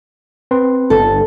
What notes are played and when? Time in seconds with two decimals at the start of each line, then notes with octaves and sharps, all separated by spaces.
0.51 C4 B4 C6
0.90 G1 A4